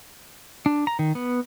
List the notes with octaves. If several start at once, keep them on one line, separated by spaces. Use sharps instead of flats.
D4
A#5
D#3
B3